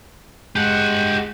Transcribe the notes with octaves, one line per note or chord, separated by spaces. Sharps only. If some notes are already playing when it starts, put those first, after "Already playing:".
G#3 G4 F#5